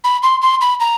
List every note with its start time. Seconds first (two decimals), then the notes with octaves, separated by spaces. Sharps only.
0.04 B5
0.23 C6
0.42 C6
0.61 B5
0.80 A#5